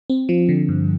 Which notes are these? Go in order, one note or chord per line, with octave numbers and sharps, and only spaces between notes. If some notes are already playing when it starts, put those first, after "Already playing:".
C4
F3
D3
G2